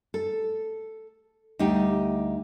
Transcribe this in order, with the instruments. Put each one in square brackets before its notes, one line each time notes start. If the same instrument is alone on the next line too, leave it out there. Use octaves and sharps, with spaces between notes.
[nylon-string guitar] A4
D2 G3 D#4 G4